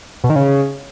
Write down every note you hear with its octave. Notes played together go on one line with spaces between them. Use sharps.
B2
D#3
C#3